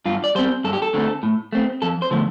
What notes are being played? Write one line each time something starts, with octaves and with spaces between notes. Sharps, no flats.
G2 F4
D5
G3 C4 C5
G2 A4
G4
A4
D3 A3 C4
A2
A3 C4
F2 A4
C5
D3 F3 A3